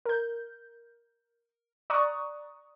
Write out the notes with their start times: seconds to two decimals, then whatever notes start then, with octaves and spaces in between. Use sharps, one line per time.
0.06 A#4 G6
1.90 D5 A#5 C#6 D#6 F#6